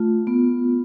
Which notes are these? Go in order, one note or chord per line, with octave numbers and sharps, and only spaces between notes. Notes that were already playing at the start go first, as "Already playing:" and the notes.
Already playing: A3 F4
B3